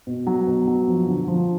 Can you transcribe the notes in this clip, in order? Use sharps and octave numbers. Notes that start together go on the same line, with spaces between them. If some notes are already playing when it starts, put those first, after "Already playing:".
B2
F#3
B2
F#3
F3
D3
F3